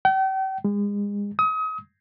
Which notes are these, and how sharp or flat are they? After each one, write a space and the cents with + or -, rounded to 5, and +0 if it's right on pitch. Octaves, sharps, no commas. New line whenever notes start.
G5 -40
G#3 -35
D#6 +35